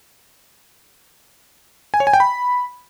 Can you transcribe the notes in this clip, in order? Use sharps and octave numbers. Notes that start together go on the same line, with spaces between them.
G#5
C#5
G#5
G5
B5